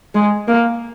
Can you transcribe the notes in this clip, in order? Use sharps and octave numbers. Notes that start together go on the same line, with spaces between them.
G#3
A#3